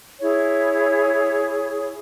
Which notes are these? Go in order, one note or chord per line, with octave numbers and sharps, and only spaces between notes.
E4 G#4 C#5